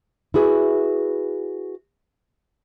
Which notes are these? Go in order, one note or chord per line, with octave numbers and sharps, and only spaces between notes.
E4 F#4 G#4 B4